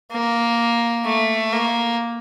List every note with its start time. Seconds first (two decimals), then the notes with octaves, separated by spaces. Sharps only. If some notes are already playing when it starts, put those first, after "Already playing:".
0.11 A#3
1.05 A3
1.53 A#3